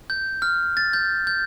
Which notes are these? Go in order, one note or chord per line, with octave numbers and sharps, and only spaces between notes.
G6
F6
A6
G6
G6